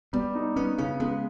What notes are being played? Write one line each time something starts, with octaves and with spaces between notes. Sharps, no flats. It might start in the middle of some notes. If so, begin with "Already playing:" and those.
G3 B3
D#4
B3 C#4
C#3 C#4
G#3 B3